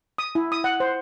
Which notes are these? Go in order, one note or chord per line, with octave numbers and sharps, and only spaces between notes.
D#6
E4
D#6
F#5
C5